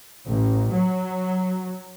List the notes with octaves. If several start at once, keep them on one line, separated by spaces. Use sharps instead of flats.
A1
F#3